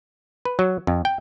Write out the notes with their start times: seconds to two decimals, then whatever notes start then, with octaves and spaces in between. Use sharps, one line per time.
0.45 B4
0.59 F#3
0.87 F2
1.05 G5